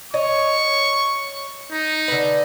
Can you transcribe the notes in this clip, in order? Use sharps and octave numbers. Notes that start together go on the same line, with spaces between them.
C#5 D#5 C#6
D#4
D3 B4